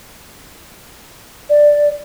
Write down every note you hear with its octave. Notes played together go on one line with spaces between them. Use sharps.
D5